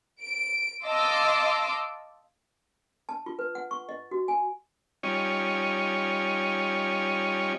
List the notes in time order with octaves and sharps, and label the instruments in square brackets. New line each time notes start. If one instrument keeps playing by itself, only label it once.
[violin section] D7
D#5 F5 A5 C6 D6 E6
[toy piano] A5
F4
B4
F#5
C#6
D#5
F#4
G#5
[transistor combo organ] G3 C#4 D#4 F4 C#5